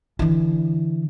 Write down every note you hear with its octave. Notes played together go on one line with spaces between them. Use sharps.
D3 E3